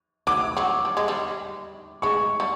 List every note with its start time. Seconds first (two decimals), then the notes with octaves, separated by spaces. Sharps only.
0.27 F#3 D6
0.57 F#3
0.85 G3
0.97 G#3
1.08 G3
2.02 G#3 C#6
2.40 G3